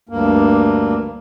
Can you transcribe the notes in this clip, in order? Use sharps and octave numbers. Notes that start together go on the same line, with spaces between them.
D2 G2 A#3